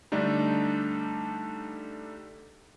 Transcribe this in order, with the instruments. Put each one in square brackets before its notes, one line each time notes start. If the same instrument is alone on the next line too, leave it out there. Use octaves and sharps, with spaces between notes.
[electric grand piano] D3 G3 A3 D4 D#4